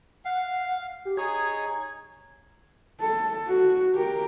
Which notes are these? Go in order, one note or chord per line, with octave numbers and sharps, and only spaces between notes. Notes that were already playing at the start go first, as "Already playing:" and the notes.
F5 F#5
G4
D#4 G#4 C#5 G#6
A4
F#4
G4 A#4